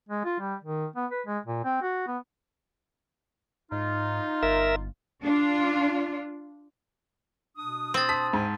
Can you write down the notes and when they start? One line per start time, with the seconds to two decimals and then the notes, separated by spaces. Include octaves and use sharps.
0.09 G#3
0.24 F4
0.40 G3
0.64 D#3
0.96 B3
1.11 B4
1.27 G#3
1.46 A#2
1.64 C4
1.82 F#4
2.07 B3
3.72 G#2 D#4 F4
4.43 G1 A#4 E5
5.23 D4 F4
7.57 B2 D4 D#6
7.94 C4 C6 A6
8.09 A5 B6
8.33 G#2 E5 G5 G#5